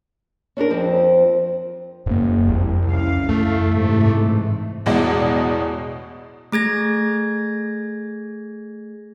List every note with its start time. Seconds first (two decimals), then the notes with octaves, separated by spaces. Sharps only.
0.57 C#4 D4 G4 A#4
0.70 F2 F3 C4
2.06 F#1 F#2 A#3
2.48 C2 F2
2.89 C#3 E3 F5
3.29 F#2 A3
3.72 G#2 C3 E3
4.06 A2
4.86 A1 E2 B2 G#3 D5 D#5
6.52 A3 G#4 G#6 A#6